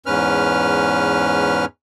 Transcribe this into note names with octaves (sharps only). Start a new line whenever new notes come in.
E2 G#2 C#4 B4 F6